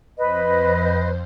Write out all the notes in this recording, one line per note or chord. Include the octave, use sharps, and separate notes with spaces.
F2 B4 C5 D#5